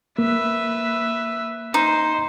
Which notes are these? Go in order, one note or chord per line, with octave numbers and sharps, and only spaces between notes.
A#3 B4 E5
D#4 C5